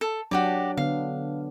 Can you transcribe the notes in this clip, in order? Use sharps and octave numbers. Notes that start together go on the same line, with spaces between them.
A4
F#3 D4 F#4 G4 D5
D3 B3 F5